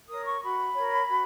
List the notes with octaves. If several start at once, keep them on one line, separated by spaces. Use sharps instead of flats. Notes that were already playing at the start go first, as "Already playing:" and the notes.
A#4 C#5 D#6
C#6
F#4 B5
A#4 C#5
F#4